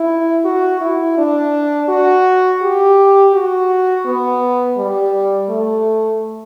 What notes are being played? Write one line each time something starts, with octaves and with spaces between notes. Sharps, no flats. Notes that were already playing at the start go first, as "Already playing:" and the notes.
Already playing: E4
F#4
E4
D4
F#4
G4
F#4
B3
G3
A3